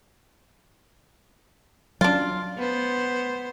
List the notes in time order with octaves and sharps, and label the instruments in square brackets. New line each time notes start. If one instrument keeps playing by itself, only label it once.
[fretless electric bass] F#3 C#4 [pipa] D4 F4
[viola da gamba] B3 C5